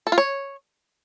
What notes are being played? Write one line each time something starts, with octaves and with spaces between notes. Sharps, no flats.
A4
F4
C#5